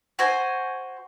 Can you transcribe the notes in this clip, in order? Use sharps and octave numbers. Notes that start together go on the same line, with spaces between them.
F#4 C5 G#5